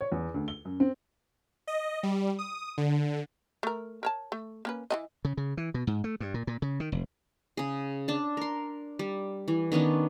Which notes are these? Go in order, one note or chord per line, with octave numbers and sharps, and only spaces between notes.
C#5
E2
D2
G7
F#2
C4
D#5
G3
D#6
D3
A3 A#4
A#4 C#5 A5
A3
A#3 C#4 B4
E3 C4 D#5
C#3
C#3
E3
B2
G#2
A3
G2
A#2
A#2
C#3
D#3
F1
C#3 G#4
D4 A5
A#4 C6
G3
E3
D#3 B3 C#4 D4